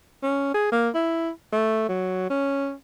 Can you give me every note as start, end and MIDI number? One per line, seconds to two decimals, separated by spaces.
0.23 0.49 61
0.54 0.69 68
0.72 0.89 58
0.94 1.30 64
1.52 1.84 57
1.89 2.27 54
2.30 2.73 61